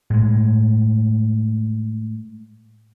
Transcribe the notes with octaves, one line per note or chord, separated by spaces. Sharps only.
A2 G#3